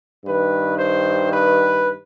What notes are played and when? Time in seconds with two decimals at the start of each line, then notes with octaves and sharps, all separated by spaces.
0.25 G2 D#3 B4
0.78 C5
1.31 B4